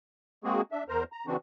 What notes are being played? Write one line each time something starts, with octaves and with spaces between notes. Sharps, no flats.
G#3 A#3 C4 F#4 G#4
D4 E5
E2 A#4 C5 A#5
A#5
C#3 E3 C4 D4 F#4